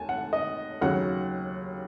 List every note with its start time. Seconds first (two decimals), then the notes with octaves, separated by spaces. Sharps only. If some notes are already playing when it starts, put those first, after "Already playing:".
Already playing: D#2 G#5 A5
0.09 F#5
0.33 D#5
0.81 D#2 C#3 F#3 F#5